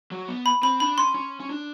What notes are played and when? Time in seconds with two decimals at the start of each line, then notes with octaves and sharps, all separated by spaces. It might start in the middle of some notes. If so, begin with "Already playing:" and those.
0.11 F#3
0.28 B3
0.46 B5
0.63 C4 B5
0.80 D4 B5
0.98 C#4 C6
1.15 C#4
1.40 C#4
1.50 D4